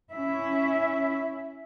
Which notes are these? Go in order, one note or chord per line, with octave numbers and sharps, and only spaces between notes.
C#4 E4 E5